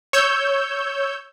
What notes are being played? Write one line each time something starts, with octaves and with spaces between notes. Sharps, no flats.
C#5 E6 G6